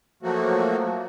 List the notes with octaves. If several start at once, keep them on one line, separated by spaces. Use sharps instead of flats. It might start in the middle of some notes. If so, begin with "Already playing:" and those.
F3 F#3 A3 A#3 F#4